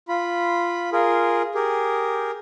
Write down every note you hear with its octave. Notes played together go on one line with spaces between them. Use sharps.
F4 B5
F4 G#4 A#4
G4 G#4 A#4